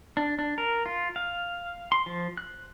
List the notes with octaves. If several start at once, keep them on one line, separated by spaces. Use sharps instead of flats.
D4
D4
A#4
F4
F5
C6
F3
F#6